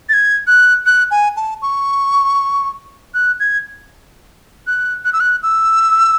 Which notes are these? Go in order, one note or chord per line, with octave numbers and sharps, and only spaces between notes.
A6
G#6
F#6
F#6
G#5
A5
C#6
F#6
G#6
F#6
F#6
E6
F#6
E6